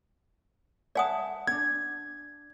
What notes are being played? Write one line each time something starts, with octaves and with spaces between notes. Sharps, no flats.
D5 E5 F#5 G#5 A5 D#6
C#4 D4 G#6